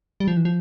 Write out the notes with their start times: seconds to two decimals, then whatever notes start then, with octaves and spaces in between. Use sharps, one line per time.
0.20 G3
0.28 F3
0.37 E3
0.45 F3